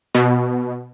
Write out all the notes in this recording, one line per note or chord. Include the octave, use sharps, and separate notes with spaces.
B2